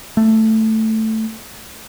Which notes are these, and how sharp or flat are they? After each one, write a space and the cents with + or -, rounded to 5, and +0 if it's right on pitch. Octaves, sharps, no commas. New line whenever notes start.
A3 +5